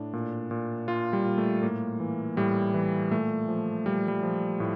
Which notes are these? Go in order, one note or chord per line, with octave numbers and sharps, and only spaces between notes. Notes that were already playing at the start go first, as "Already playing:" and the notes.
Already playing: A2 D4
A#2
A#2
A#2 F4
G3
A#2
A3
A2 A#3
E3
A2 G3
E3
A#2 A3
F3
A#2 G3
G3
F3
A2